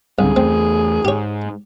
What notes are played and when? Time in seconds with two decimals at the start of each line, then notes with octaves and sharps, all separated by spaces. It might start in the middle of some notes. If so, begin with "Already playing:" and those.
0.19 C2 G#2 D3 G#4
0.36 E2 A3 C4
1.05 G#2 G4 C#5